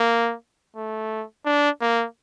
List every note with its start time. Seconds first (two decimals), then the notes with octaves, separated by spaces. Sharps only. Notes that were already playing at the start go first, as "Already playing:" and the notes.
Already playing: A#3
0.76 A3
1.46 D4
1.81 A#3